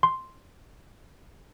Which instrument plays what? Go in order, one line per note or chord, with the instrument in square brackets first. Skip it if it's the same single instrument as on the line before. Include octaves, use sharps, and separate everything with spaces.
[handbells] C6